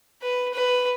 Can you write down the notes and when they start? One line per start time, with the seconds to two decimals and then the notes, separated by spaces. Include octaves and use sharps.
0.22 B4
0.54 B4